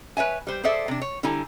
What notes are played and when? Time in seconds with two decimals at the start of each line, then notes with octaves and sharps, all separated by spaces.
0.17 B4 C#5 E5 G#5
0.47 G3 C5
0.64 G#4 A4 C5 D5 E5
0.88 C3 D4
1.01 C#5
1.23 D3 G3 E4 A4 G#5 A#5